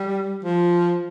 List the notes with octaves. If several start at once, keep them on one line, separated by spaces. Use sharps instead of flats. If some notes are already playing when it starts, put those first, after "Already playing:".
Already playing: G3
F3